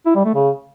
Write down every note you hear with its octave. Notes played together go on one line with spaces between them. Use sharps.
E4
G3
A3
C#3